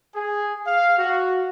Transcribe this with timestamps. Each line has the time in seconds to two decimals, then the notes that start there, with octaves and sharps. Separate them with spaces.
0.15 G#4
0.66 F5
0.98 F#4